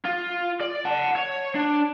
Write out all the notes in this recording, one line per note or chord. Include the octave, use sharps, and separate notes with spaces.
F4
D5
F#5 A5
C#5
D4